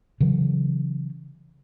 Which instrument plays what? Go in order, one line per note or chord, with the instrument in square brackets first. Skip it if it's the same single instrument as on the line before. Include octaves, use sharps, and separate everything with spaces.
[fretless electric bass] C#3 E3 F#3